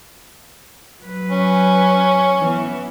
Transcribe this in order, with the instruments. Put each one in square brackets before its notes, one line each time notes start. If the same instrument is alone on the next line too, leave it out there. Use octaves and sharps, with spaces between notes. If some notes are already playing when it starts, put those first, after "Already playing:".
[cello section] F#3 B4
[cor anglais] C#4
[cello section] E3 B3